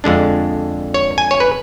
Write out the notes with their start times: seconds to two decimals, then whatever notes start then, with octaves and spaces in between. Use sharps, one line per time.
0.04 F2 D3 G#3 D4
0.94 C#5
1.18 G#5
1.31 C#5
1.40 B4